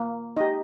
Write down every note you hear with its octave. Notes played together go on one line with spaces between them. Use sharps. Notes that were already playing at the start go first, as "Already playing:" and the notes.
Already playing: A#3
D#4 G4 D#5